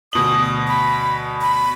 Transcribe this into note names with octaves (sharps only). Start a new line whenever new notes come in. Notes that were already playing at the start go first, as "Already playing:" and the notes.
D2 B2 D#6 F#7
B5
B5